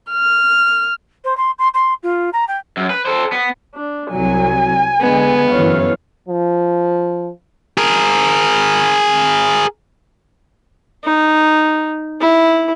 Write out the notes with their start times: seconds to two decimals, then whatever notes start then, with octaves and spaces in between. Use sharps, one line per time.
0.11 F6
1.24 C5
1.37 C6
1.58 C6
1.74 C6
2.03 F4
2.33 A#5
2.48 G5
2.77 F#2
2.90 B4
3.06 A4 C5
3.32 B3
3.75 D4
4.12 C2 F#3 G#5
5.01 D3 G#3 B3
5.50 G1 F#2 E3 C#5 F5
6.28 F3
7.78 G#4 A#4
11.04 D#4
12.21 E4